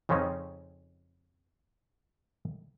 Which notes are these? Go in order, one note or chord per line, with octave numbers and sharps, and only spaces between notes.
F2 C#3 F3 C4 C#4 D#4